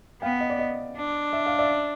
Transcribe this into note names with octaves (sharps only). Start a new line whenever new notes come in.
B3 F5 G5
D#5
D5
D#5
D4
E5
F5
D5 E5